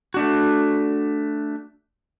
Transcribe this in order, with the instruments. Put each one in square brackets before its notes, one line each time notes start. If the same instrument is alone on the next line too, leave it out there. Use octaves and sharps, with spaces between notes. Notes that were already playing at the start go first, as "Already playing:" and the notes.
[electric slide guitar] A3 D4 F#4